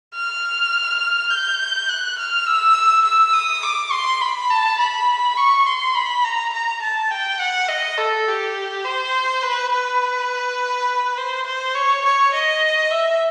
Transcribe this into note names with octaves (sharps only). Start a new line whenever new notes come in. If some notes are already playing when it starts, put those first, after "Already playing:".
F6
G6
F#6
F6
E6
E6
D#6
D6
C6
B5
A5
B5
C#6
C6
B5
A#5
A#5
A5
G5
F#5
D#5
A4
G4
C5
B4
B4
C5
C5
C#5
C#5
D#5
E5